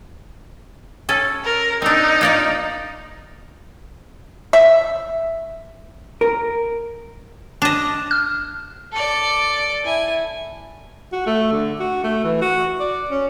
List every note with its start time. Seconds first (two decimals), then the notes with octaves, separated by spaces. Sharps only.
1.09 C#4 A4
1.45 A#4
1.82 C4 D4 D#4
2.21 A#3 F4 D5
4.53 E5
6.21 A#4
7.62 D4 D#5 E7
8.11 F6
8.92 A4 D5
9.84 E4 G#5
11.12 F#4
11.26 A3
11.52 D3
11.80 F#4
12.04 A3
12.24 E3
12.41 F#4
12.80 D5
13.11 C#4